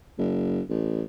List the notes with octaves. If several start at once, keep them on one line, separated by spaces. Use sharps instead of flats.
F#1
A1